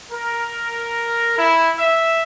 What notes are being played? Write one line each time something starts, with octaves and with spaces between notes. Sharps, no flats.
A#4
E4
E5